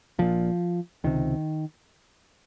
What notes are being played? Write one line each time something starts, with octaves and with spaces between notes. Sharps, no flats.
A#1 A#2 F3
C#2 C3 D#3